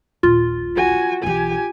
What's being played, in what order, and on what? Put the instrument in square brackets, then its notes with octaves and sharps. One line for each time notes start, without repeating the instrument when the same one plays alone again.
[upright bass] D#1 A#1 [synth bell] F4
[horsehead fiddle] F#4 G#5
[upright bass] B1 E3 [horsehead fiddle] G4 G#5